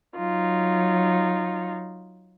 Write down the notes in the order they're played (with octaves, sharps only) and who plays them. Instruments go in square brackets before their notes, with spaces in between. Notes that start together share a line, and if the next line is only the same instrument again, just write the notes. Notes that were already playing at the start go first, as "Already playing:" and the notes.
[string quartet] F#3 D#4 F4